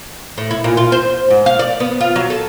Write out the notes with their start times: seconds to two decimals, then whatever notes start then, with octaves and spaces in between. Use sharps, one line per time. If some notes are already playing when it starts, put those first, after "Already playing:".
0.38 A2
0.51 E4
0.64 A#2
0.77 F4
0.92 C5
1.31 G#2
1.46 F5
1.59 D5
1.80 B3
2.01 F4
2.16 F#3
2.30 A4